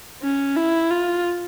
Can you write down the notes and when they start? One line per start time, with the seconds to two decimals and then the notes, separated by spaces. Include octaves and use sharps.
0.22 C#4
0.57 E4
0.91 F4